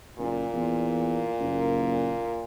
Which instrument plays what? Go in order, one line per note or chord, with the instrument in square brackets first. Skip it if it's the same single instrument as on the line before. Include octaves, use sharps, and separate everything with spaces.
[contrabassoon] F#1 [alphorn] A#2
[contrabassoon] E2
F#1